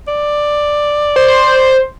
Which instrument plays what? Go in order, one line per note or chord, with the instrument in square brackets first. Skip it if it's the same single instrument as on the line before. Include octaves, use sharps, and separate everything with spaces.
[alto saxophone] D5
[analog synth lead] C5